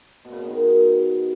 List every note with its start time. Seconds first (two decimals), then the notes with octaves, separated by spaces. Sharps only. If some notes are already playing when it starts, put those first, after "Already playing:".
0.25 B2
0.32 C#3
0.40 B2
0.47 D#3